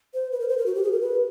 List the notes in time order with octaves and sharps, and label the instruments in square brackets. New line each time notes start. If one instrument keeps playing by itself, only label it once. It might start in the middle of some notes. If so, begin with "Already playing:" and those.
[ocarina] C5
B4
A#4
C5
A#4
F#4
G4
G#4
A#4
B4